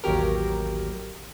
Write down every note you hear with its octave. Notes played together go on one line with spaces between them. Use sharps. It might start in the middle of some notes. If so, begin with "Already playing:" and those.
A1 D#2 F#3 G4 A#4